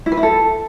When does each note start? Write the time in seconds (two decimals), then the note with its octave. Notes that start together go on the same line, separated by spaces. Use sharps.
0.06 E4
0.12 B4
0.17 E4
0.23 A4